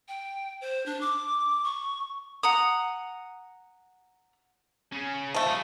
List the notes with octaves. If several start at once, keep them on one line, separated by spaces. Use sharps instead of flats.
G5
C5
D4
D6
C#6
F#5 A#5 D#6
C#3 C#4
F3 A3
G3 G#4